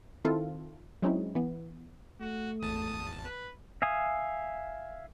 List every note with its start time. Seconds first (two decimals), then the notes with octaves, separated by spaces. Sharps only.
0.25 D#3 C4 E4 F4 A4
1.02 F#3 G#3 C4 C#4 D#4 E4
1.35 E3 B3
2.20 A3 F#4
2.62 G#1 E2 A5 D#6
3.25 B4
3.82 E5 F5 G#5 D#6